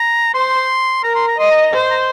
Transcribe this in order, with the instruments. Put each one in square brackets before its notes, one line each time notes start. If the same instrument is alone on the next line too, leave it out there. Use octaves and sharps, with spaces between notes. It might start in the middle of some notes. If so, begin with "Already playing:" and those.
Already playing: [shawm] A#5
[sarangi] C5 [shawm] C6
[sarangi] A#4 [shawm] A#5
[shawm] C6
A#5
[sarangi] D#5 [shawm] C6
[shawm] A#5
[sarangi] C5
[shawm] C6
A#5